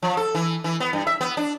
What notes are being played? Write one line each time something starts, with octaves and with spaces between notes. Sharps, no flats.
F3
A4
E3
E3
B3
G2
E5
B3
D4